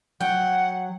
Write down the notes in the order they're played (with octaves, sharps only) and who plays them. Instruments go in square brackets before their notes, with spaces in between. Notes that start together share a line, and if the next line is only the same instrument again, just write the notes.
[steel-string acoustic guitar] F#3 [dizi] F#5 [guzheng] G5